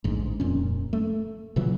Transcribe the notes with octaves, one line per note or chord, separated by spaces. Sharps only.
A1 D2 G#2
D#1 F2 A#2 C#4
A3
A#2 C#3 E3 F#3